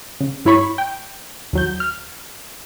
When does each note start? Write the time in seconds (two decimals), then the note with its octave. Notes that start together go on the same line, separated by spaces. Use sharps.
0.20 C#3
0.45 G2 E4 C#5 B5 C#6
0.78 G5
1.53 D#2 F#3 G6
1.80 F6